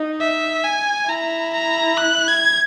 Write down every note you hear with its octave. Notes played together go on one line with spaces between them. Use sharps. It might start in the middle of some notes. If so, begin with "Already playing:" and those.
Already playing: D#4
E5
G#5
E4 A#5
A#5
F#6
G#6